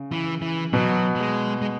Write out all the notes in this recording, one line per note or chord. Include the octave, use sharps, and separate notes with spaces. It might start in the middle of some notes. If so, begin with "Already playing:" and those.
Already playing: C#3
E3
E3
B2 F#3
F#3
G#3
G#3